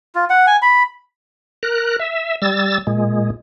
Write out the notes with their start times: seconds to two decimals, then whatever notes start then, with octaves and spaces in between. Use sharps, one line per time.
0.15 F4
0.30 F#5
0.47 G#5
0.62 B5
1.63 A#4 F#6
1.99 E5
2.42 G3 E6 A6
2.87 A#2 G#3